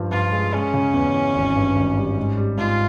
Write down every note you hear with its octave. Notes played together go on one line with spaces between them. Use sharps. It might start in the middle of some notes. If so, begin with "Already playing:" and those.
Already playing: G2 F3
G2 F4
G#3
G#3 C#4
C#3
E2
E3
G#1
G2
G#1
G3
G#2
G3
G#2 F4